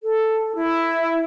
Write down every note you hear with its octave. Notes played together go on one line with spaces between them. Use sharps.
A4
E4